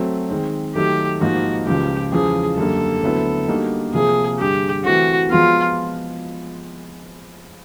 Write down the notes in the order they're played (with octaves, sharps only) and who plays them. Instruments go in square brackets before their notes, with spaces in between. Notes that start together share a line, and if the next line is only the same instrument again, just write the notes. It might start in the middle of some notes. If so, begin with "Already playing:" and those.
Already playing: [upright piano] F#3 A3 C4
D#3 G#3 C4
[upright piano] D#3 F#3 A3 [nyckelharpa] G4
[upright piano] G#2 F3 A#3 D#4 [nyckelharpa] F#4
[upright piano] C#2 C#3 F3 [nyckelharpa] G4
[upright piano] E2 C#3 F3 G#3 [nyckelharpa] G#4
[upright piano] F#2 D3 G3 A#3 [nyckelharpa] A4
[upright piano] D2 D3 F#3 B3 E4
D3 G3 A#3 D#4 F#4
[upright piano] C3 F3 A#3 [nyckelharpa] G#4
[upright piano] G2 D3 G3 [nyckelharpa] G4
[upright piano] E3 A3 C4 [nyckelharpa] F#4
[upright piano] F3 G#3 B3 [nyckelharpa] F4